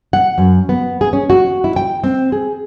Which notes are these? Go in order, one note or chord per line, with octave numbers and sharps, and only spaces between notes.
F#5
F#2
B3
G#4
C#4
F#4
E4
G5
C4
G#4